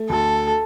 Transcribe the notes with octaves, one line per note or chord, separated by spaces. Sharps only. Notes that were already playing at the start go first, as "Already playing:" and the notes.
Already playing: A3
D2 A4